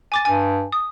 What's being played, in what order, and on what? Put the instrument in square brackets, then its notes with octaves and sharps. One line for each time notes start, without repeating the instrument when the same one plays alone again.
[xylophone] G#5 D6 A6
[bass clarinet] G2 [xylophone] G#5
[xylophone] D#6